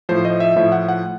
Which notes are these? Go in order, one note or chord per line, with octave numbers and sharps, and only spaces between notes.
A2 F3 C5
D#5
E5
A2 F3 E5
F#5
F#5